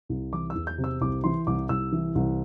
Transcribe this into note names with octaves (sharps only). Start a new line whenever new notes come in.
C2
E3 D6
E6
E2
G6
C3
E6
C2 D6
E3 C6
C2 D6
C2 E6
E3
C2